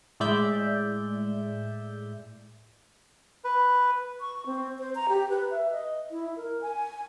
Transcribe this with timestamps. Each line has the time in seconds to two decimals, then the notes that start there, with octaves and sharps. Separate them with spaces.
0.20 A2 G#3 D5 E5 G6
3.44 B4
4.20 C#6
4.46 C4
4.79 C5
4.95 A#5
5.09 G4
5.29 B4
5.51 E5
5.72 D#5
6.11 E4
6.36 A#4
6.61 G#5